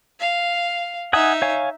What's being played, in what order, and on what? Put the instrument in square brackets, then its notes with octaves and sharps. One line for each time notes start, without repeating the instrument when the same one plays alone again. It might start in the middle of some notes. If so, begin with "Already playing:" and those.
[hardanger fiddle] F5
[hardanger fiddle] D#4 E5 [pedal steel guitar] F#5 G#5 D#6
[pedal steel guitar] C#5 F5 G#5